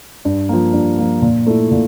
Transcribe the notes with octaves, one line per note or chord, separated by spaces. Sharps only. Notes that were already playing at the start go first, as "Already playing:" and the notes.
G2
F3 A#3
G2
F3 A#3
A#2
A3 E4
A#2